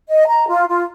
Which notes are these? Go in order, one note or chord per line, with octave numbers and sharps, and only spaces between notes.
D#5
A#5
F4
F4